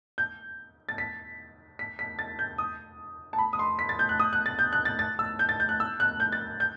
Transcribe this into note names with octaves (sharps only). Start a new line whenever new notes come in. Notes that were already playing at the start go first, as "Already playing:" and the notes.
G6
A6
B6
B6
B6
A6
G6
D#6
A5
B5
D#6
C6
B6
A6
G6
F#6
D#6
F#6
A6
G6
F#6
A6
A6
E6
G6
A6
G6
F#6
E6
F#6
G6
A6
G6